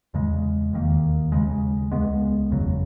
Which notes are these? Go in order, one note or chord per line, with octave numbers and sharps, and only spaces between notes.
E2 C#3 G#3
E1 D#2 D#3 A#3
D#2 C#3 G#3
C#2 C#3 G#3 B3
F#1 E2 C#3 F#3